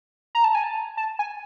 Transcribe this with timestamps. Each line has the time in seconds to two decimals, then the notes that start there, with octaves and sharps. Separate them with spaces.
0.35 A#5
0.44 A5
0.55 G#5
0.64 A5
0.97 A5
1.19 G#5